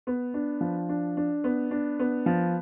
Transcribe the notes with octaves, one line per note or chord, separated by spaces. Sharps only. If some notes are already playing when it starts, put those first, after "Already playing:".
B3
D4
F3
D4
D4
B3
D4
B3
F3